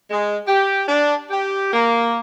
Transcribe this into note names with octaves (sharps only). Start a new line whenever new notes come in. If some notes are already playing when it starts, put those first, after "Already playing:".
G#3
G4
D4
G4
A#3